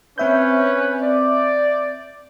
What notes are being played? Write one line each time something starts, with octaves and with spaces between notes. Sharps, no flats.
C4 C#4 B4 E5 G6
D5